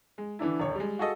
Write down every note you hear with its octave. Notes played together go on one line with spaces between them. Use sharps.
G#3
D3 E3 D4 E4
D#1 D2 C#5
G3 G#3
F4 F#4 G#4 A4 D#5